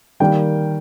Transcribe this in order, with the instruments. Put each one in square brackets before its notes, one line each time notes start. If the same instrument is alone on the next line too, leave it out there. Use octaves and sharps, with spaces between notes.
[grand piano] D#3 G3 A#3 G5